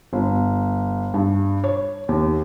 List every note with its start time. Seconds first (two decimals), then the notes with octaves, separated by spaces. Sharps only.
0.13 G1
1.14 G2
1.64 C#5
2.09 D#2